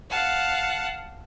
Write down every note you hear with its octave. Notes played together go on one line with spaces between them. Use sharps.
F5 F#5 A5